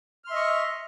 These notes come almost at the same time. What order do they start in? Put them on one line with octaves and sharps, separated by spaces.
F6 C6 E5 D#5 C#6